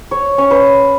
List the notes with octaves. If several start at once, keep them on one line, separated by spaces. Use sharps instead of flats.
C#5
C#4
B4